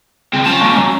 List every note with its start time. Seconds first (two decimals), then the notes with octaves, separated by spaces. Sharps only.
0.33 C#2 C4
0.45 C#4 F4 A5
0.61 G#3 A#3
0.77 F#3